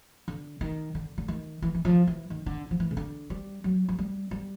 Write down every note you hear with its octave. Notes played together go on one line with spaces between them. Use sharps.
D3
D#3
D3
D3
D#3
E3
E3
F3
E3
D#3
D3
F3
E3
C#3
D3
G3
F#3
F#3
G3
G3